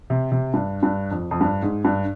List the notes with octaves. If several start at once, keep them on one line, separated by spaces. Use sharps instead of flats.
C3
C3
G2
G2
F2
F2
G2
G#2
G2